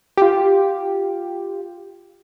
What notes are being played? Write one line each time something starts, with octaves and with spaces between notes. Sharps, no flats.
F4 G4